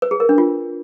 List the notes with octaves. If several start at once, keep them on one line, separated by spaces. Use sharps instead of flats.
B4
G#4
A#4
D4
F4